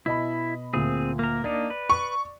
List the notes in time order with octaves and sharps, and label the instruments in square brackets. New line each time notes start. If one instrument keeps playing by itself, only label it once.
[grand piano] B2 D#5 B5 [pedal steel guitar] E4
[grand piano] D2 A#2 [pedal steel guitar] C4 G#4
[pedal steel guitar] A#3 A#4
[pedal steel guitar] A#3 D4 D#4 [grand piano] D5
[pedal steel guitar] B4
[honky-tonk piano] C#6